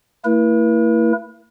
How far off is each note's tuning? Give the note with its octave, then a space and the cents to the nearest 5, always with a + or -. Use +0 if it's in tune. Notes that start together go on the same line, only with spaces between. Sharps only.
A3 +45 E4 +0 B4 -45